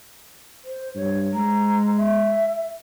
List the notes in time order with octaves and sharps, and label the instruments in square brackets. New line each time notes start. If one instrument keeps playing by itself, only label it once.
[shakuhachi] C5
[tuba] G2 [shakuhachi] C#5
[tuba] G#3 [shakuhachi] A#5
[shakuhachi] E5